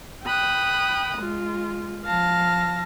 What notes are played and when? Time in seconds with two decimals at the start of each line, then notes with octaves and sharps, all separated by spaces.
0.25 G5 B5 D#6 F#6
1.17 G#3 F4
2.05 F3 F5 A5 A#6